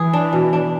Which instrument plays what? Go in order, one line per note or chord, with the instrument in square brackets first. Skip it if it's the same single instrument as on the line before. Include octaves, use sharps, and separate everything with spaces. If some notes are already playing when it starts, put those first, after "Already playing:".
Already playing: [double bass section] E3 [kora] G#4
[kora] D4
B2
D4